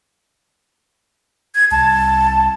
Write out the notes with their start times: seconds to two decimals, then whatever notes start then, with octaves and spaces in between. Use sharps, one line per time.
1.55 G#6
1.71 C2 A5